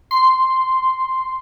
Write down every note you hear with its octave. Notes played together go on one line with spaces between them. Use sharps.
C6